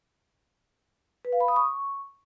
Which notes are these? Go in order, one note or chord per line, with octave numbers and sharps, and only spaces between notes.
B4
F5
B5
D#6
C#6